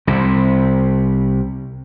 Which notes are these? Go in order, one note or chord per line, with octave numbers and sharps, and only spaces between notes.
C2 C3